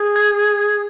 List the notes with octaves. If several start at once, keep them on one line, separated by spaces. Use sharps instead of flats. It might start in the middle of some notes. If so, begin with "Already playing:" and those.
Already playing: G#4
G#6